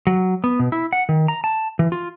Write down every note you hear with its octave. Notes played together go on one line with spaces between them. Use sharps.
F#3
B3
B2
E4
F#5
D#3
A#5
A5
E3
F4